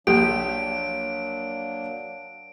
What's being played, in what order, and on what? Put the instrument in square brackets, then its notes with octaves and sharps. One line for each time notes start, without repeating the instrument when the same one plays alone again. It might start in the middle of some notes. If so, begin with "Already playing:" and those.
[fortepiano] A#1 G4 [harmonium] F#3 A#3 D4 [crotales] D7